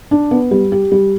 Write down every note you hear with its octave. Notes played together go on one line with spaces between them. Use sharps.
D4
B3
G3
G4
G3